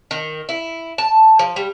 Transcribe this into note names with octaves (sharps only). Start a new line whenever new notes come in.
D#3
E4
A5
F3
G3